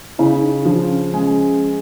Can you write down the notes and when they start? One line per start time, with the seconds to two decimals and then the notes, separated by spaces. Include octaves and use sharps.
0.18 C#3 E4
0.42 D#4
0.65 F3 D4
0.89 C#4
1.14 G#3 C#4